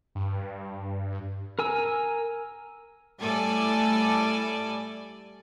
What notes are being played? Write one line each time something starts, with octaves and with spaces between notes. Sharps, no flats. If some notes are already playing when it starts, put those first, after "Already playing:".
G2
A#4 G#5 E6
A2 G3 A4 D5 G#5